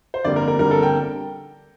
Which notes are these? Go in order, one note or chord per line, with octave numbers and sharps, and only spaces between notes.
C5
G1 F2 D3 G3 A#3 D5
A#4
A#4
G1 F2 D3 G3 A#3 A#4
A4
G5